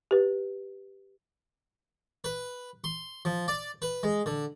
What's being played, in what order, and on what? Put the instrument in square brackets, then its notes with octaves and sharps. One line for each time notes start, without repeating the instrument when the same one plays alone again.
[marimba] G4 B4
[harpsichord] B4
C6
F3
D5
B4
G#3
D3